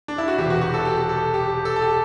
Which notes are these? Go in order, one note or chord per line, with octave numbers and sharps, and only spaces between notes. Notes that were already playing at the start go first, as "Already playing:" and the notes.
D4
E4
F#4
E1 E2 C3 E3 G4
F#4
F#4
A4
G4
A4
G4
A4
A4
G4